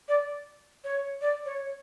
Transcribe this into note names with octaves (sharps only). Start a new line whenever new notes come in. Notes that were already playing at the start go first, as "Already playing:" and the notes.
D5
C#5
D5
C#5